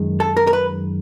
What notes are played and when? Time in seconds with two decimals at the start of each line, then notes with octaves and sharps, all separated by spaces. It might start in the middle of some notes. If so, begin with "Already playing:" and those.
Already playing: F#2 D#3 G#3
0.20 A4
0.37 A#4
0.47 A#4
0.53 B4